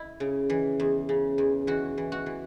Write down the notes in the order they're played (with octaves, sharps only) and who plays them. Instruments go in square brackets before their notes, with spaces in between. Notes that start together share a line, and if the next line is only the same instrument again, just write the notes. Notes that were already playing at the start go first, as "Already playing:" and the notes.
Already playing: [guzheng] E4
C#3
E3
E2
C#3
E2
E3 F#4
E3
F#4
E3